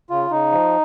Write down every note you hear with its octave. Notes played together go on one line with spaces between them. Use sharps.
C#3 F4
C#3 D#4
F3